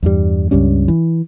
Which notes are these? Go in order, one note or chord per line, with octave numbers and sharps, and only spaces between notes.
E2 G2 G3
C#2 G2 G3 C#4
E3